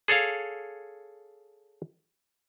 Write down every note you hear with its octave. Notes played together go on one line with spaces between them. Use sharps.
G#4 A4 C#5 F5